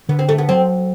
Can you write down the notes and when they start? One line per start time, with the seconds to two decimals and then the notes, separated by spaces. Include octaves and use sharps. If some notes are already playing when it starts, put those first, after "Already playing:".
0.09 D3 B3
0.19 C4
0.29 A3
0.38 B3
0.49 F#3 C4